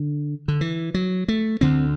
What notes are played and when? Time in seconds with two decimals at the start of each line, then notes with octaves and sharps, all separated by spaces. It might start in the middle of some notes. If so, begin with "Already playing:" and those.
Already playing: D3
0.48 D3
0.61 E3
0.94 F#3
1.28 A3
1.61 D2 D3 C4